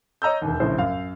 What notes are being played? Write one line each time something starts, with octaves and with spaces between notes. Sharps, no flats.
C#5 D#5 A#5 E6 G6
E1 D#2
A#1 A2 C#3 C5
F#2 F5